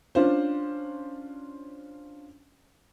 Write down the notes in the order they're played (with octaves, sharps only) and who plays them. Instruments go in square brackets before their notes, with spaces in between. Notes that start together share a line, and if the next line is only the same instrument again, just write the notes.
[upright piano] C#4 D4 F4 C5